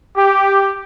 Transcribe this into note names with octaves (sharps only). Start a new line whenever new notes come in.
G4